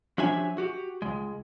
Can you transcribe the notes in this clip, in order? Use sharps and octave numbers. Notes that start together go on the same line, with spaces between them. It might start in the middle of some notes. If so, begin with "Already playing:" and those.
F3 F#3 D4 G4 E5 G#5
F#4 G4
C#2 G#3